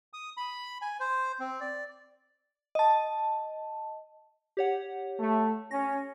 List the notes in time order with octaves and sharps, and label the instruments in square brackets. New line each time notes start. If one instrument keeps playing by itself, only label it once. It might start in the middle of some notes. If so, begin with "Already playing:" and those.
[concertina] D#6
B5
G#5
C5
C4
D5
[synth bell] D#5 A5
G4 C#5 F#5
[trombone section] A3
[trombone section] C#4 [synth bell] A#6